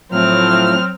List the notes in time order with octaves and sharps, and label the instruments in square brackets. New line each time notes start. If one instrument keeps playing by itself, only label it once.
[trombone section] A2 F3 [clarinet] F#3 [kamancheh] C4 F6